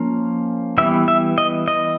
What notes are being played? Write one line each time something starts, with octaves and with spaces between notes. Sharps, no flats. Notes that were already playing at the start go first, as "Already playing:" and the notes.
Already playing: F3 A#3 C#4
E3 G3 B3 E5
E5
D#5
D#5